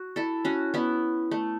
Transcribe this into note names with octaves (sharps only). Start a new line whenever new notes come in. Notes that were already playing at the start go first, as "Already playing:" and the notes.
Already playing: F#4
E4 A4
C#4 F#4
B3 E4
A3